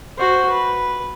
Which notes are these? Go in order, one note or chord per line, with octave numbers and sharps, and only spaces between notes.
F#4 C5
B4